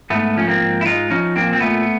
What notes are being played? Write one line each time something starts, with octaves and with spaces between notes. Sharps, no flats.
G#2 A3 B3
F3 C#4
A#3 C4
G#2
E4
G#3 D#4 F4
F3 C#4 D#4
A#2 A#3 C4
C4
A#2 A3 B3